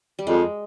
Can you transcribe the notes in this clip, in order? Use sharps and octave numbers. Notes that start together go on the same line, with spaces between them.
G3
F2 G#3